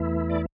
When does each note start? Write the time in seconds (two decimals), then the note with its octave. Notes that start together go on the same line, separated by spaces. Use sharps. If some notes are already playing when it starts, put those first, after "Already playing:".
Already playing: E2 E3 A3 E4
0.30 D5